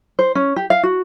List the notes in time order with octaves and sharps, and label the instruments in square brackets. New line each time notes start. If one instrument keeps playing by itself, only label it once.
[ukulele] C5
C#4
G4
F5
F#4